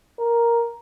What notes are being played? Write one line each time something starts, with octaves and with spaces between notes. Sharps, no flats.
A#4